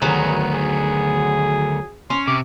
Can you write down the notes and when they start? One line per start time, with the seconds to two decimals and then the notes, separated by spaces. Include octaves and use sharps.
0.02 D2 D#3 F#3 B3 G#4
0.53 G#4
2.10 C#4 C6
2.28 C3 D6